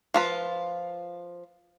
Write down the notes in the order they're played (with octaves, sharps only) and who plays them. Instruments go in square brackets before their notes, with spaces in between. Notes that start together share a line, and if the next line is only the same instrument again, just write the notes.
[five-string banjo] F3 F4 B4